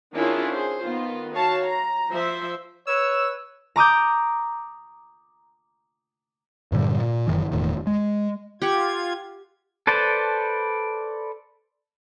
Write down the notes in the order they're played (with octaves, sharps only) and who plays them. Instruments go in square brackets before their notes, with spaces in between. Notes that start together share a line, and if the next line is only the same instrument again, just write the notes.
[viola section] D#3 C#4 D4 E4 F4 G#4
G#4 C5
D#3 B3 F4
F#4 C#5 F5 A5
A#5
F3 C5 E5
[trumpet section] B4 C#5 [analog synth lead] E6
[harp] A#5 D6 D#6 G6
[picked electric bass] G2 A#2 D3 G3
A#2
F#1 F#2 D#3 E3
E1 E2 A2 D#3
G#3
[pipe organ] F4 G#6 [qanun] G4 F#5
[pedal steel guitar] A4 B4 C5 D5 A5